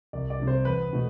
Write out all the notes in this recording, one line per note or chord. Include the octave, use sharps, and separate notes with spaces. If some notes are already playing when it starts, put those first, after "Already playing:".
C2 D5
D5
C3 G3
C5
E2 B4
B2 A3